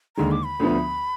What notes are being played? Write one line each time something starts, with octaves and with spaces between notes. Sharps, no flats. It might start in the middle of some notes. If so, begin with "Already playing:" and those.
D#2 D3 G#3 A#5
D6
B5
D2 D3 F3 B3